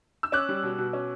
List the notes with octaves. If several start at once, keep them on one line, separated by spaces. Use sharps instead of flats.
E6
C#4 D6 F#6
G3
B2
B2
C#4